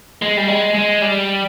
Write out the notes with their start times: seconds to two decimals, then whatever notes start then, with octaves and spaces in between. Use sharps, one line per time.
0.22 G#3
0.37 G3
0.48 G#3
0.74 G#3
1.02 G3